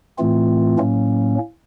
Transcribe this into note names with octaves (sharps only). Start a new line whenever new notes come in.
A2 E3 A3 C4 F4
A2 F#3 A#3 C#4